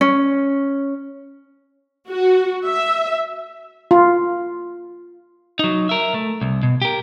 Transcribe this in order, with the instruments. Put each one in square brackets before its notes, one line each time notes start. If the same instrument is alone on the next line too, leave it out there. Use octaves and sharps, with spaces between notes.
[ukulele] C#4
[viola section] F#4
E5
[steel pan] F4
[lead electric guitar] F#3 D#4
A#4 E5
A3
C2
B2
G4 A#4